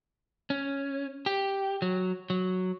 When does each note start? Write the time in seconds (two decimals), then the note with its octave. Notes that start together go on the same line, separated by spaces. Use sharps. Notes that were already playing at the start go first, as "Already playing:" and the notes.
0.50 C#4
1.26 G4
1.82 F#3
2.30 F#3